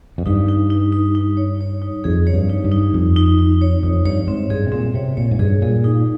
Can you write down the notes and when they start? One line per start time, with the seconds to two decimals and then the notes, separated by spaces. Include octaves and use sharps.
0.18 F2
0.26 G2 D#4
0.48 D#4
0.70 D#4
0.93 D#4
1.15 D#4
1.37 C#5
1.61 C#5
1.82 D#4
2.04 F2 G#4
2.27 C#5
2.34 G2
2.49 D#4
2.65 G2
2.72 D#4
2.94 F2 D#4
3.16 D#4
3.39 D#4
3.61 C#5
3.83 F2 D#4
4.05 G2 C#5
4.27 G#2 C4
4.50 G2 G#4
4.67 C3
4.72 A#2 C4
4.94 C3 C#5
5.17 A#2 C#5
5.31 G#2
5.39 G2 G#4
5.62 A#2 G#4
5.84 D#4